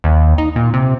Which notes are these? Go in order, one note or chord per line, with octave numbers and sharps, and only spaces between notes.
D#2
D#4
A#2
C3